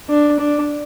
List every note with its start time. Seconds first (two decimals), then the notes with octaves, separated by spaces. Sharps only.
0.10 D4
0.40 D4